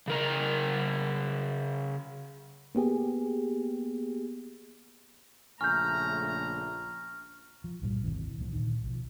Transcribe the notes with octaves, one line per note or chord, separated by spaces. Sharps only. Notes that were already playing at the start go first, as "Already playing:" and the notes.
C#3 A#4 A#5
A#3 B3 G4 G#4
A#1 C#3 A3 G#5 A#5 C#6 F6 G6
F3
C2 G2 A#2 G3
G#1 D#2 C3 E3
D#1 C2 F3 A#3
A#2 D3 D#3
B1 F3